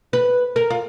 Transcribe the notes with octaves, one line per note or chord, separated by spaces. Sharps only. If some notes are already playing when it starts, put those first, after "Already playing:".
B4
A#4
F4